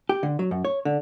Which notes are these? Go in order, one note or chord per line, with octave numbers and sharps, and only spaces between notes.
G4
D3
F#3
F#2
C#5
D3